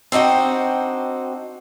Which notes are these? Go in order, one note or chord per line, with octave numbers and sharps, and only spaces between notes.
C4 D4 D#4 F#4 G5